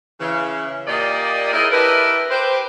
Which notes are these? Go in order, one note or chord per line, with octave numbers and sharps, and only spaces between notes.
C#3 E3
A#2 A#3 G4 D5 D#5
D#4 E4 G#4 A#4 C#5 D#5
D4 E4 G4 A#4 B4
G4 B4 C5